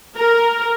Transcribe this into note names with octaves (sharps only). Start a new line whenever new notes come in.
A#4